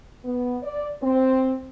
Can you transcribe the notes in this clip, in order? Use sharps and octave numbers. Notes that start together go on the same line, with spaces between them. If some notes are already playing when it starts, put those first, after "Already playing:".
B3
D5
C4